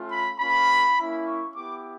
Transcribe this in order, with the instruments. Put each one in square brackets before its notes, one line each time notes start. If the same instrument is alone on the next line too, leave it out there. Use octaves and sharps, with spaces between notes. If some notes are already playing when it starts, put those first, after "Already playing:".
Already playing: [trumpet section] A3 C#4 F4
B5
A#3 C#4 F4 B5
A#3 C#4 E4
C#6
B3 E4 G4 D6